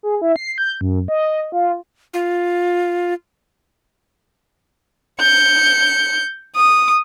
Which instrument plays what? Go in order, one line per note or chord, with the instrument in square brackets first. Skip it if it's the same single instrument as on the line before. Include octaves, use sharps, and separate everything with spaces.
[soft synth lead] G#4
E4
C7
G6
F#2
D#5
F4
[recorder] F4
[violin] G6 C#7
D#6